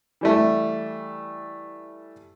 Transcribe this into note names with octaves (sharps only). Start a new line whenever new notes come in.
E3 G3 A3